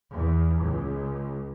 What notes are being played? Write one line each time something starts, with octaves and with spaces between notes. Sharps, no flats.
E2
C#2